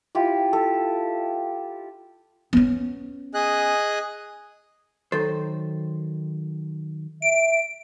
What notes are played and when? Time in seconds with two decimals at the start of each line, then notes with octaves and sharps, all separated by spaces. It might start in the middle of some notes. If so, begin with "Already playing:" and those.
0.15 E4 F4 G4
0.53 A4
2.53 B3 C#4
3.34 G#4 D#5 F#6
5.12 D#3 F#3 A4 C5
7.22 E5 D7